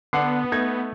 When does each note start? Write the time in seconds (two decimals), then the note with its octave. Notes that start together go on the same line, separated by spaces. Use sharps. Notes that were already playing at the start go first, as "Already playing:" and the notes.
0.13 D3 B3 D4 F#5 C7
0.52 A3 D#4 G#6